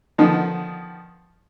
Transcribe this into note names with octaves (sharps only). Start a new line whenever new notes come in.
D3 D#3 F3 B3 D#4